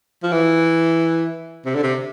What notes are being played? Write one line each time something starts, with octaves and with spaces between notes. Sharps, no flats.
F3
E3
C3
D3
C3